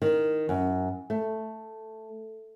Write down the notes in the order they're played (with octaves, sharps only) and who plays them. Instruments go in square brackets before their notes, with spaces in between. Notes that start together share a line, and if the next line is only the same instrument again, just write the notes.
[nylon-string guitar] D#3
F#2
A3